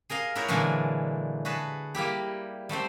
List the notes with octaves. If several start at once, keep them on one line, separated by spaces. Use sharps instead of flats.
G#4 A#4 D#5 F5
D#4 E4 F#4 A#4 C#5
A#2 D3 E3 F#3 G#3
F#4 G#4 B4 A5
G3 A#3 E4 G4
G3 A3 C4 C5